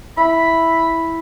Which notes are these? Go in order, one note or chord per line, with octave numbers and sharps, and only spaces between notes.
E4 B5